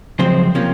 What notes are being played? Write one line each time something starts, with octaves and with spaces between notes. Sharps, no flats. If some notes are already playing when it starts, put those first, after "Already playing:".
F#2 C#3 F3 G#3 C4 C5
C3 F3 A#3 C#4